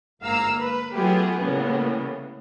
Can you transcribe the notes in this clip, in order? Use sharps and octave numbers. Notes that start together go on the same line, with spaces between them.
G1 G#2 A#3 F5 A#5 E6
B4
F#3 A3 B3 F4 G4 G#4
A2 C#3 G3 A#3 B3